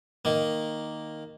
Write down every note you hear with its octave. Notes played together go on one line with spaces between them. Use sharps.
D#3 A#3